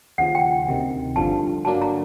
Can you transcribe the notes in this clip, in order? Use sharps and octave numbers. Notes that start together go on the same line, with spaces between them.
D#2 C#3 F3 F#5
G5
D2 C3 D#3
G1 G2 D3 F3 A5
D3 F#3 A#3 D4 A5
A#5